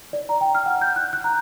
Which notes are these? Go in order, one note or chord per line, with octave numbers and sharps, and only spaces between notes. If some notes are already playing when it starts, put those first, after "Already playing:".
D5
A#5
G5
F6
F#5
G6
F#6
F#6
A#5